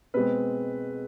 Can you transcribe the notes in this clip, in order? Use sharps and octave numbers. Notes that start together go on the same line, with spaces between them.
B2 G#3 C4 B4